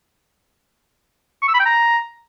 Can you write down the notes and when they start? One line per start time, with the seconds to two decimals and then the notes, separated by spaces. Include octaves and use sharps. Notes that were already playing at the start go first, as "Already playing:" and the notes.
1.42 C#6
1.48 E6
1.54 B5
1.60 G5
1.66 A#5